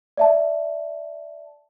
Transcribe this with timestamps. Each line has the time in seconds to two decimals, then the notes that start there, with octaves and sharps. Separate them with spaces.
0.17 D5 E5 A5